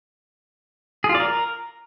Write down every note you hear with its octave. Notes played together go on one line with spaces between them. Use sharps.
G#4
F4
D5
A#4